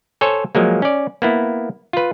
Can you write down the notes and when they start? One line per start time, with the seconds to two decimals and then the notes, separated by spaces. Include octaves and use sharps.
0.21 A4 C5 C#5 G#5
0.55 F3 F#3 G#3 A#3
0.82 C#4 D5
1.22 A#3 B3 E4
1.93 F4 B4